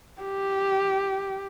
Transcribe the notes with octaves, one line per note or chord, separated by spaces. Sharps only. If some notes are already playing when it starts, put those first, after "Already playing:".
G4